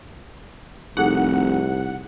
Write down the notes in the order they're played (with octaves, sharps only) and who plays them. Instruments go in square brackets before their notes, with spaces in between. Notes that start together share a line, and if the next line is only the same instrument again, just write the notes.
[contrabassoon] F1 [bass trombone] C2 [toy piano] D#4 G#4 A4 [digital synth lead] F#5